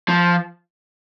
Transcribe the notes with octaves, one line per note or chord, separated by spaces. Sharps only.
F3